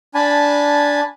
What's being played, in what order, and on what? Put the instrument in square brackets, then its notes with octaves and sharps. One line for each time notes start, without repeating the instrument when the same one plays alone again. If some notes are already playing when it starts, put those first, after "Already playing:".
[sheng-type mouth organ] D4 G#5 A5 B5